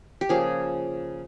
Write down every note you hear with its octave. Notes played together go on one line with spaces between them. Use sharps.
G4
C#3 F3 A#3 G#4